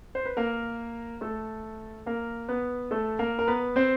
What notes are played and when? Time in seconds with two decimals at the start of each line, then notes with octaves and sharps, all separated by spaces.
0.15 C5
0.25 B4
0.37 A#3 A#4
1.21 A3 A4
2.06 A#3 A#4
2.49 B3 B4
2.91 A3 A4
3.19 A#3 A#4
3.39 A#4
3.47 B3 B4
3.76 C4 C5